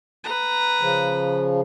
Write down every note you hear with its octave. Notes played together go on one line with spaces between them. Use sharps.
B4 A#5
C#3 F3